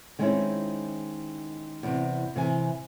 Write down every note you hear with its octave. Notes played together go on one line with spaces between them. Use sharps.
D#3 G#3 C4 C#4 D#4 E4
E2 C3
C3 E3 G#5